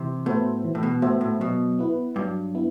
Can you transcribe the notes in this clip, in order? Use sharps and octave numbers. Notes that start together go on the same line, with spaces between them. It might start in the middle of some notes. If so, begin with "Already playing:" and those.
Already playing: C3 E3
A2 B3 F#4 C5 E5
E3
A2
B2
A2 B3 F#4 C5 E5
A2
B2 F#3
B3 E4 B4
G2 F#3
B3 E4